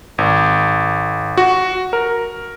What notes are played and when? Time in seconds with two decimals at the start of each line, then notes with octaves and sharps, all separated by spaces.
0.18 G#1
1.37 F#4
1.93 A#4